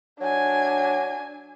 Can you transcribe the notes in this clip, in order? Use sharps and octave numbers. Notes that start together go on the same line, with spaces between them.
F#3 D4 G#5